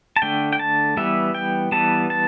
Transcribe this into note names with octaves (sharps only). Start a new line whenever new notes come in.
A5
D3 A3 G5
G5
A5
E3 G3 B3 E5
G5
E3 G3 B3 A5
A5